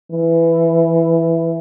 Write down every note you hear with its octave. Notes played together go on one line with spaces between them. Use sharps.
E3